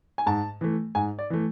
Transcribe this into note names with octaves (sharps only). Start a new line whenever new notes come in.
G#5
G#2 A5
E3 A3
G#2 G#5
D5
E3 A3